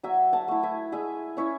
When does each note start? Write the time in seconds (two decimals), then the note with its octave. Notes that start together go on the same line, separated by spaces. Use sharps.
0.03 F#3 E5 G#5
0.33 F#5 A5
0.48 A3 E4
0.63 E5 G#5
0.92 G#3 E5 G#5
1.37 C#4 E4 C#5 E5